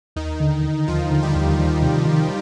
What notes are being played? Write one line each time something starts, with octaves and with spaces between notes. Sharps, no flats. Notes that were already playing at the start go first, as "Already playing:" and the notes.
D#2 D#3 D#4
D3
D3
D#2 F3 F4
D3
G3 G4
D#2
D#3
C3
D#3